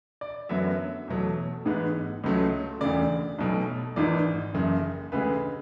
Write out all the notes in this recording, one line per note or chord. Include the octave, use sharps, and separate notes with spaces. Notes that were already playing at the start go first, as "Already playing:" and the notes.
D5
F#2 D3 F#3 B3 E5
E2 B2 F#3 A3
A1 G#2 G#3 B3
C#2 C#3 F#3 A3
E1 D2 C#3 D5
B1 B2 F#3 A3
G#1 G#2 E3 D5
F#1 F#2 C#3
D2 C#3 G#3 B4